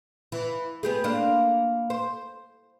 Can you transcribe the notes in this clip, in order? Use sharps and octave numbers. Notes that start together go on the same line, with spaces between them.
E3
B3 G4 G#4
A#3 D4 C5
C5